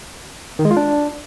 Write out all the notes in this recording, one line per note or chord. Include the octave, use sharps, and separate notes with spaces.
D#3
G#3
F4
D4